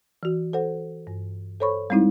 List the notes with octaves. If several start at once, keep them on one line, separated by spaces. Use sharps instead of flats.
E3 F#4
A4 C5 F#5
G2
A4 C5 C#5 B5 C#6
G3 G#3 C4 D#4 E4